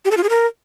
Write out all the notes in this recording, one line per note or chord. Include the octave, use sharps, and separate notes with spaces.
G4
A4
F4
G#4
A#4